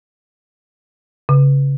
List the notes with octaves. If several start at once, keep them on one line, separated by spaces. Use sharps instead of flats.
C#3